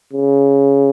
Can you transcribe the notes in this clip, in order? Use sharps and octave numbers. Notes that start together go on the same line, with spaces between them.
C#3